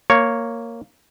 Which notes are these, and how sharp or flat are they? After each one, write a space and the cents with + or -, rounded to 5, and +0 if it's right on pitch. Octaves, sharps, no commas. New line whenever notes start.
A#3 -5 C#5 +0